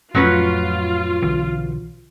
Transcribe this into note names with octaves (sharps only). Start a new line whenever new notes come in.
F2 A2 F#3 C#4 F4 B4
B1 D3 E3